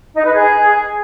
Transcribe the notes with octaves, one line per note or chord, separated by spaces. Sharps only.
D#4
B4
G#4